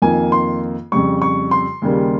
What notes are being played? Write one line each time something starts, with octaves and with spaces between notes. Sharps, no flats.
F2 D#3 A#3 F4 G#5
C6
F2 C#3 G3 C#6
C#6
C6
D#2 C#3 G3 A#3